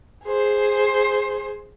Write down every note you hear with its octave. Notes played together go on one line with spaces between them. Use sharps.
G#4 C5